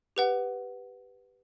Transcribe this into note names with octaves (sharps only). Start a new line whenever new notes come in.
G4 B4 F#5